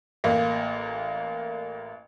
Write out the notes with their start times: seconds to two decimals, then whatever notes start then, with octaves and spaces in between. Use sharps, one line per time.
0.24 A1 A#3